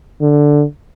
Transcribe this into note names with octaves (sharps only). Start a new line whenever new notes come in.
D3